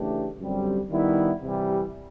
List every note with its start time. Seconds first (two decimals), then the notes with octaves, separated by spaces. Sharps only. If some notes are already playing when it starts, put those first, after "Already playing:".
Already playing: C#3 E3 A3 D4 G4
0.39 F#2 D3 G3 C4
0.90 D#3 G3 B3 E4
1.42 C3 E3 G3